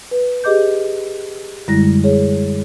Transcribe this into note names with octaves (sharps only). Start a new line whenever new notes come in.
B4
G4 G#4 D#5 D6 G6
F#2 D3 G3 G#3 E4 A#6
G#4 C#5